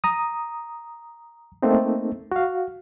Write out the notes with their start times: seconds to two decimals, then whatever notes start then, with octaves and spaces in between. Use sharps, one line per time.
0.04 A#5 D#6
1.62 A3 A#3 C4 D#4
2.32 F#4 F5